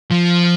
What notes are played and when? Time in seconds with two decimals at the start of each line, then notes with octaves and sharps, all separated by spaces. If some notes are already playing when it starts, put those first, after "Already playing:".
0.11 F3